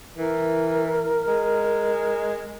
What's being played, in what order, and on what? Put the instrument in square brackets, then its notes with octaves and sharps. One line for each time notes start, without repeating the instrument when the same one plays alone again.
[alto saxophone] E3 [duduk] A#4
[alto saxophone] G#3